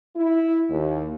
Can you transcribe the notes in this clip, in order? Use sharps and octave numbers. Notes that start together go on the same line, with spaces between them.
E4
D#2